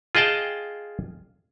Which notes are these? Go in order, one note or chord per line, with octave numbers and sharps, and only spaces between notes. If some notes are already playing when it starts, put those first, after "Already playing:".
F4 G#4 D#5 G5 A5